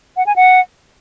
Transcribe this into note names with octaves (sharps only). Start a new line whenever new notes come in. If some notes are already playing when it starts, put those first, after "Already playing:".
F#5
G#5
F#5